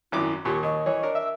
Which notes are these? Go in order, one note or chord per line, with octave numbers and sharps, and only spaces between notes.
G#1 F#2 E4 D6
D#2 A#2 G4 C#6
D#2 D#5
E3 C#5
D4 A#4
E5